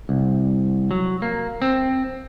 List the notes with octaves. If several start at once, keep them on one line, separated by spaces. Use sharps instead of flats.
C2
F#3
A#3
C4